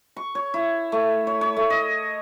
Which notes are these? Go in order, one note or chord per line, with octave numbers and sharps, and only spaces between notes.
C#6
C#5
E4
A3
C#5
C#5
A3
D#5